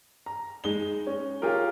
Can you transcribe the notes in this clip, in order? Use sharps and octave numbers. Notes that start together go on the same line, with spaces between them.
A#5
G#3 D#4 G7
C#4
F4 G4 G#4 A#4